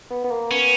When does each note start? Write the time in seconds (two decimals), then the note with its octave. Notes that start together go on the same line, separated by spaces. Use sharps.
0.11 B3
0.24 B3
0.31 A#3
0.51 B3 C#4